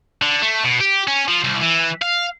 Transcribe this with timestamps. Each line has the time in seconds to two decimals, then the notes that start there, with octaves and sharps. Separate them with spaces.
0.22 D3
0.42 A3
0.64 B2
0.80 G4
1.07 C#4
1.28 F3
1.45 C2
1.62 E3
2.02 F5